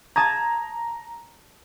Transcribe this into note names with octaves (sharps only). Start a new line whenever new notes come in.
A5 A#5 D#6 G#6